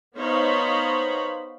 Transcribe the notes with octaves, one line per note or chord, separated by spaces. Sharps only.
B3 D#4 C5 C#5 F5 B5